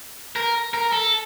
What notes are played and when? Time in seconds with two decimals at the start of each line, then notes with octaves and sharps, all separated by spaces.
0.36 A#4
0.74 A#4
0.92 A4